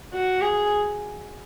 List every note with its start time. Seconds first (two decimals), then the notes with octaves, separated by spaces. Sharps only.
0.13 F#4
0.41 G#4